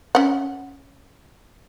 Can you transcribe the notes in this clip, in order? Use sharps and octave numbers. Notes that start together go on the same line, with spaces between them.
C#4 F#5